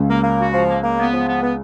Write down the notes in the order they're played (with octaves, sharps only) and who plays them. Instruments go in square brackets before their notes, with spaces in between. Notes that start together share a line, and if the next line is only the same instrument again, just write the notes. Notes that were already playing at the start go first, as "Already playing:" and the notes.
Already playing: [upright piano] C#2 C#3
[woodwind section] A#3
A#3
F#4
F3
A#3
A#3
B3
F3
B3
B3